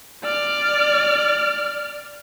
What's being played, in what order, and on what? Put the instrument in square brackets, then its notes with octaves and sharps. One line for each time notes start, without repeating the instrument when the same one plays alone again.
[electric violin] D5 F6